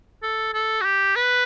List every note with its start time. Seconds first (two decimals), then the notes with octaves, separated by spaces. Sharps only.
0.23 A4
0.54 A4
0.81 F#4
0.85 G4
1.16 B4